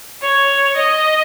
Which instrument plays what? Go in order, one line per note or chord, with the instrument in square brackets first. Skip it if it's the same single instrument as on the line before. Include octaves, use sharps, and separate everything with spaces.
[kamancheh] C#5
D#5